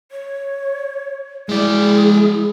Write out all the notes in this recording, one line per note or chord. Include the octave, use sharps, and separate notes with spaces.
C#5
G#3 E4 G#4 D5